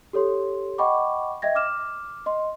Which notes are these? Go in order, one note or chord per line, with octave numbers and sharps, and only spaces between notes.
G4 A4 C#5 C6
D#5 F#5 G5 B5 C#6 D6
D#5 E5 G5 G#6 A#6
D6 F6 E7
D#5 C6